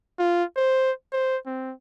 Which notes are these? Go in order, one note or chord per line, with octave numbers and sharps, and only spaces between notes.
F4
C5
C5
C4